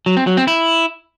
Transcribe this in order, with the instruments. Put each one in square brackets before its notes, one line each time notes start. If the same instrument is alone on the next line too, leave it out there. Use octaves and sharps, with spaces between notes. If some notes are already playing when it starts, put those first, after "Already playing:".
[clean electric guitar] F#3
C4
F#3
C4
E4